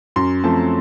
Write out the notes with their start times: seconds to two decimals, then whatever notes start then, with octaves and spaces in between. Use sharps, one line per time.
0.16 F#2 C6
0.44 F3 A3 C4 A5